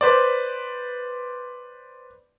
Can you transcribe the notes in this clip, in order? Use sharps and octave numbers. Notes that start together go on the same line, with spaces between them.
B4 C5 D5